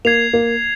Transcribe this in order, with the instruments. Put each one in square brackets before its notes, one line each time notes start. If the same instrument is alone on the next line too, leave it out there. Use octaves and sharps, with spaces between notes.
[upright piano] A#3 [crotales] G#6 C7 F7
[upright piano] A#3